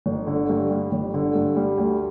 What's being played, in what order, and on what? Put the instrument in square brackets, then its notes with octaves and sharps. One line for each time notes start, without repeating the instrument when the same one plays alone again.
[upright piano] G1
D3
G2
G3
G1
D3
G2
G3
D2